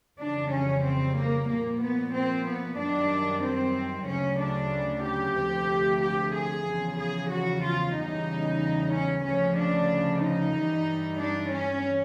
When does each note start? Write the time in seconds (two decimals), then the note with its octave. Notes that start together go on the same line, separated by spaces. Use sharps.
0.19 F2 C#3 E3 G3 D4
0.51 C#4
0.83 C4
1.16 A#3
1.48 A#2 F3 A#3
1.81 B3
2.13 C4
2.46 B3
2.78 F#2 D#3 G3 D4
3.43 C4
4.07 D2 C#3 F#3 C#4
4.39 D4
5.04 G4
5.36 D2 C3 F3
6.01 G4
6.34 G#4
6.66 E2 C#3 F3
6.99 G#4
7.31 F#4
7.63 F4
7.95 E2 C#3 E3 G3 D#4
8.93 C#4
9.25 D2 C#3 F3 C#4
9.57 D4
10.23 D#4
10.54 G2 E3 G3
11.19 D4
11.51 C#4